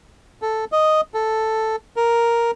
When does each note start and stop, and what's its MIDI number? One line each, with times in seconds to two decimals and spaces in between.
0.42 0.65 69
0.72 1.01 75
1.14 1.76 69
1.96 2.51 70